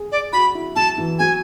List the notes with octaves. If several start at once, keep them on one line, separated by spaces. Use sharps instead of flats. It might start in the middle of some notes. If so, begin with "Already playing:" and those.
Already playing: G#4
D5
F#4 B5
E4
F#3 A5
E3
F#3 G#5